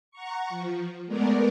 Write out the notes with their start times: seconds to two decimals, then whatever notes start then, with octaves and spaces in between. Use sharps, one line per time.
0.11 F#5 A#5 C#6
0.49 F3
1.06 G#3 A3 B3 A#4 D5